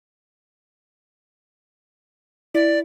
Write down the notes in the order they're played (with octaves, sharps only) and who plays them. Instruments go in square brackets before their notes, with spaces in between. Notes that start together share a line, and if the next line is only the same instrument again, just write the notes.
[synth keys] E4 [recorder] D5